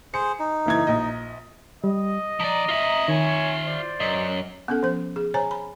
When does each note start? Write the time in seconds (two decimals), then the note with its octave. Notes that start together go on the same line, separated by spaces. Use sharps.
0.14 G#4 C5 C#7
0.39 D#4
0.66 F#1 E3 G#6
0.87 A#1 D#5
1.84 G3 D#5
2.40 F3 D5 A#5
2.69 F4 E5
3.08 D#3 C#5 G#5
3.65 C5 D5
4.00 F#2 D#5
4.68 B3 C#4 A4
4.83 F3 C5
5.16 G#4
5.34 C5 C#5 G#5 A#5
5.51 B5